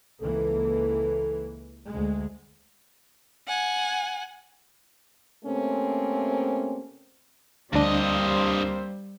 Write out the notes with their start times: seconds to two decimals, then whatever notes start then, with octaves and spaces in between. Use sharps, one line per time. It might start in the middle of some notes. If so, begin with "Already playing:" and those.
0.22 C#2 E3 A#3 A4
1.88 D2 G#3
3.48 F#5 G#5
5.45 C3 A3 A#3 C4 C#4
7.73 D2 G2 G3 A#3 C4 D4 C5 D#5